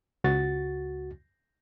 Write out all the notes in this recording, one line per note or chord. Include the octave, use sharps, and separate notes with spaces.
C#2 F#4 A6